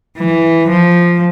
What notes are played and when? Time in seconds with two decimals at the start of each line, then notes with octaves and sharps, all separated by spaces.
0.18 E3
0.69 F3